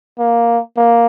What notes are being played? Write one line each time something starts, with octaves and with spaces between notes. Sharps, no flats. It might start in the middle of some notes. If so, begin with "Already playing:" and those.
A#3
A#3